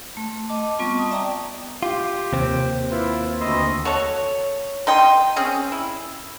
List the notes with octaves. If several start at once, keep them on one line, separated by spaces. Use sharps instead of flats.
A3
D#5 A5 D6
G3 B3 C4 F4 C#6
A5 D#6
D5 E5 G5 A5 A#5 D6
F4 G4
D#2 C3 C4
E4 F4 B4
D2 D#5 B5 C6 E6
F#4 A4 C#5
D#4 G5 C6 D#6
C4 C#4 G#4
E4